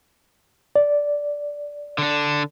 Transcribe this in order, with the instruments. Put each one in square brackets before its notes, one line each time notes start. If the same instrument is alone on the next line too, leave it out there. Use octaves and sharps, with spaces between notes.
[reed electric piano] D5
[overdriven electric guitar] D3 D4